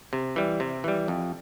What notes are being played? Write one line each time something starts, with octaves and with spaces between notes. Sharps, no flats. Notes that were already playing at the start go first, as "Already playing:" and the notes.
C3
E3 G3
C3
E3 G3
F2